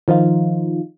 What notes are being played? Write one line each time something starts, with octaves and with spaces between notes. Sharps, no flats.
D#3 F3 D#4 F4